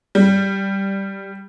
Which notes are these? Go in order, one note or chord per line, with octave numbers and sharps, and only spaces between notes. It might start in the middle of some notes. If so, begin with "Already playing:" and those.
G3